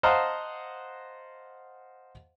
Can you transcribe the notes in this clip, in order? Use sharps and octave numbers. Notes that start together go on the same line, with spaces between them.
C5 D#5 F5 F#5 A5 A#5